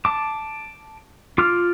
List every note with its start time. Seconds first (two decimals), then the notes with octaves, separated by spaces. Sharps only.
0.05 A5 D6
1.38 F4 D6 F6